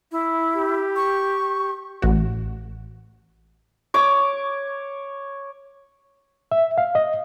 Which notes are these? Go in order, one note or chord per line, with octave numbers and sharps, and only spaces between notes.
E4
G4
C#6
A1 F#4
C#5 D6
E5
F5
D#5